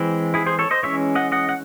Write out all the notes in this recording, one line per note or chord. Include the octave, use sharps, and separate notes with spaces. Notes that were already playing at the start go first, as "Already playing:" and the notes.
Already playing: E3 G#3 C4
E4 G#4
G#4 C5
A4 C#5
C5 D#5
E3 G#3 C#4 C#5 E5
D#5 F#5
D#5 F#5
F#5